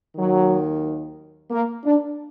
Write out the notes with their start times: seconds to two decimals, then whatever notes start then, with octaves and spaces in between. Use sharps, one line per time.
0.16 D#2 D#3 F#3
1.50 A#3
1.84 D4